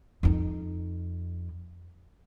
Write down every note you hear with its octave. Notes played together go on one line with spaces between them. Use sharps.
F2 D#4